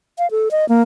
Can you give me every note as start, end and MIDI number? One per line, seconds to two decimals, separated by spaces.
0.18 0.30 77
0.31 0.49 69
0.51 0.68 75
0.69 0.82 58